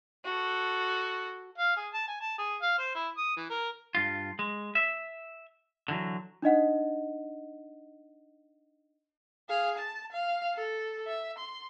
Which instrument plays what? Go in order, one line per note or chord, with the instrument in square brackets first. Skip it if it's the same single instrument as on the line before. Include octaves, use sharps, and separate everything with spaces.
[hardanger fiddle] F#4 A4
[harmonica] F5
G#4
A5
G#5
A5
G#4
F5
C5
E4
D#6
E3
A#4
[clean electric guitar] G2 F4
G#3
E5
D3 E3 F#3
[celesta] D4 D#4 D#5 F#5
[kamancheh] G#4 F5
A5
F5
A4
E5
C6